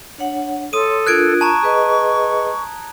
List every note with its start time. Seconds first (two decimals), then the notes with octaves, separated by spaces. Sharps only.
0.18 D4 C#5 F#5
0.73 A4 C#5 C6 D#6 D#7
1.07 D4 F4 A#4 F#6 G#6 D7
1.41 A5 A#5 C#6
1.63 G#4 B4 D#5